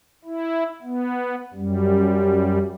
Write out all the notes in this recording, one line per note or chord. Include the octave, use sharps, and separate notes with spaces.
E4
B3
F#2 G3